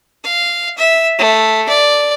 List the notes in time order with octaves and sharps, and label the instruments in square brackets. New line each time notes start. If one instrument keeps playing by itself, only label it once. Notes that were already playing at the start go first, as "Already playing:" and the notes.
[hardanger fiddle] F5
E5
A3
D5